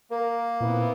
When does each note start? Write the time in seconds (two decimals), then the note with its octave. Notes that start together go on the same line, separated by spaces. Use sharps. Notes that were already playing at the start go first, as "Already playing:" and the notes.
0.11 A#3 A#4
0.60 A#2 B3 C4 E4